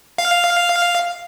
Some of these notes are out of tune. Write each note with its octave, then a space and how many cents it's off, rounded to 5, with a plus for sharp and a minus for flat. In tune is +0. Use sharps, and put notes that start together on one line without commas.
F5 +0